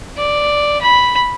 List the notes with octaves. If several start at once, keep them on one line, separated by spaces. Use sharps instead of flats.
D5
B5